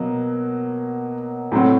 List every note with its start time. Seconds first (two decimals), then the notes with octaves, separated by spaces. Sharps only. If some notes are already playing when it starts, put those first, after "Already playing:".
Already playing: B2 F#3 A#3
1.52 A2 F#3 A3 C4